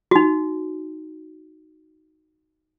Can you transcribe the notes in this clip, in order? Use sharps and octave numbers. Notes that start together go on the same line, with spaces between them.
D#4 F#4